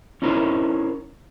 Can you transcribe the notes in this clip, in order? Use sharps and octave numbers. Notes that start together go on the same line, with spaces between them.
C#4 D#4 E4 A#4 C5 C#5